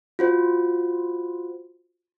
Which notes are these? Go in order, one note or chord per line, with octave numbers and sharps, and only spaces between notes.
F4 F#4 C5